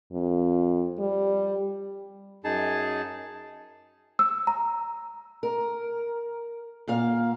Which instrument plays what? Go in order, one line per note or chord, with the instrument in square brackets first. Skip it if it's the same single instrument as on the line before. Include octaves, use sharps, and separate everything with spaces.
[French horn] F2
G3
[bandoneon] F#2 D#4 G#4 A5
[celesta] E6
A#5
[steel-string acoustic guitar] A#4
A#2 A#3 F5